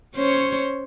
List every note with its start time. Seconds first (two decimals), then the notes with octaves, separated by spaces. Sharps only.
0.15 C#4 C5 C#5